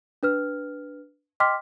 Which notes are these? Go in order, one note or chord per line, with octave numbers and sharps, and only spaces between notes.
D4 B4 F6
D#5 G5 C6 D6 F6 B6